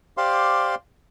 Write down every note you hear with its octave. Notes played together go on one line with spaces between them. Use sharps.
G4 C5 D5 F5 C6